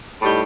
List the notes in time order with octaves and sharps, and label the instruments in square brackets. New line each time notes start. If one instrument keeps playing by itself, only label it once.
[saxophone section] A2 G3 D#4 G4